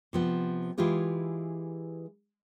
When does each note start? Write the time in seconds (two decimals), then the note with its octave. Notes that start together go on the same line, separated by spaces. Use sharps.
0.13 C3 F3 B3
0.78 E3 G#3 E4 F4 G4 G#4